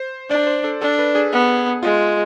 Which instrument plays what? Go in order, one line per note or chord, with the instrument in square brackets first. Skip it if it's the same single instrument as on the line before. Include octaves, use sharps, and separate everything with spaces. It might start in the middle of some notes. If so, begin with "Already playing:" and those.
Already playing: [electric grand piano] C5
[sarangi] D4 [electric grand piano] D5
[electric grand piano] C5
A4
[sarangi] D4 [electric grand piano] A4
[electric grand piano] B4
G#4
[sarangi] B3
[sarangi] G#3 [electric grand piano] F4